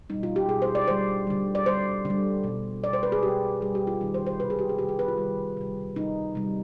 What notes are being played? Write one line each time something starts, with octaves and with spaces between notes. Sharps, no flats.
B2 G3 D#4
F4
G4
B2 G3 G#4
C5
D5
D3 G3 C5
D3 G3
D5
D3 G3 C5
D3 G3
B2 G3
B2 G3 D5
C5
B4
G#4
B2 G3 G4
B2 G3 G#4
G4
F4
C3 D#3 G3 D#4
C5
C5
C3 D#3 G3 B4
G#4
G4
G#4
C3 D#3 G3 G4
G#4
B4
F4
C3 D#3 G3
C3 G3
C3 G3 D#4
C3 G3